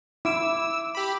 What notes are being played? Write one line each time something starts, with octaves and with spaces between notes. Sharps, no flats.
E4 D6 E6 D7 E7
G4 B5